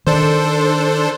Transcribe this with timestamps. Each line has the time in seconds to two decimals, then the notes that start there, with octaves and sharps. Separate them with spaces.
0.07 D#3 D4 A4 C5